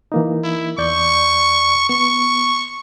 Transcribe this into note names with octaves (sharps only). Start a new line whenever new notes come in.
E3 A#3 D#4
E4
E2 D5 C#6 G6
B3 C#6